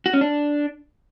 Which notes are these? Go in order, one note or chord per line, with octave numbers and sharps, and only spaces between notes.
F#4
C#4
D4